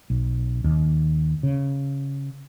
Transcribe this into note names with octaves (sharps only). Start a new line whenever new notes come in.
B1
D#2
C#3